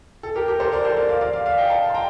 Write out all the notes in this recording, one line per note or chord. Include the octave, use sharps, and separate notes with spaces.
A4
G4 A#4
G4 A#4
A4 C5
A#4 D5
A4 C5
A#4 D5
D5 F5
D5 F5
D5 F5
D5 F5
D#5 G5
F5 A5
C6
G5 A#5